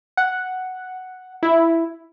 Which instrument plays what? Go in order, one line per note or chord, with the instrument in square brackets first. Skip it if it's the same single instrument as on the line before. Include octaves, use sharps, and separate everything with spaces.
[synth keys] F#5
E4